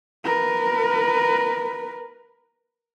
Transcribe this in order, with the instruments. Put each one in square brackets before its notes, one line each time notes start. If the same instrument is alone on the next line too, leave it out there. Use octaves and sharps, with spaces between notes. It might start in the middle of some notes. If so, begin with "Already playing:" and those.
[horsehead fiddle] A#4 B4